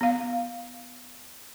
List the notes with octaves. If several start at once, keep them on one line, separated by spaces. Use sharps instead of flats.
B3 F5